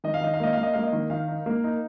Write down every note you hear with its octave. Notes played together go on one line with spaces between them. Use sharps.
D#3 D#5
F5
D#3 D#5
F5
A#3 D#5
A#3 F5
D#5
A#3 F5
D#5
D#3
D#3 F5
D#4
A#3
D#4